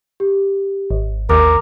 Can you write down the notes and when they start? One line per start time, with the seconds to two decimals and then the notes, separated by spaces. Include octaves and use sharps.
0.20 G4
0.90 G#1
1.30 D#2 A#4 D6